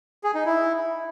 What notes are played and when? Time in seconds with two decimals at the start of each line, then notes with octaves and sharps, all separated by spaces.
0.24 G#4
0.35 D#4
0.46 E4